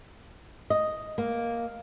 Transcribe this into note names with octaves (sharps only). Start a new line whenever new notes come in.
D#5
A#3